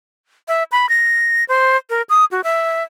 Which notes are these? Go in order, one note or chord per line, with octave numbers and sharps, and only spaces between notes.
E5
B5
A#6
C5
A#4
D#6
F#4
E5